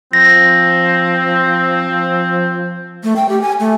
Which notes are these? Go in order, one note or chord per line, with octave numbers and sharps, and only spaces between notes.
F3 C4 A#6
A3
G5
G4
G#5
A3